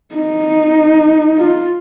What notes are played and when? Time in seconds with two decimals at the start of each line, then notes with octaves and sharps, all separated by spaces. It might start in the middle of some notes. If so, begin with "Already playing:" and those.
0.15 D#4
1.38 F4